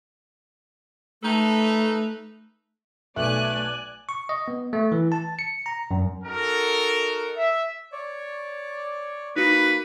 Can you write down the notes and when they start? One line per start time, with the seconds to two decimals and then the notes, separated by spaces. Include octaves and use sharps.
1.22 A3 D#4 A4 B4
3.16 B1 A3 B3 D5 G#5 F#6
4.09 C#6
4.29 D#5
4.48 B3
4.73 A3
4.92 E3
5.12 A5
5.39 C#7
5.66 A#5
5.91 F#2
6.24 D#4 F#4 A4 A#4
7.37 E5
7.92 C#5 D5
9.36 A#3 D#4 F#4 B4 B5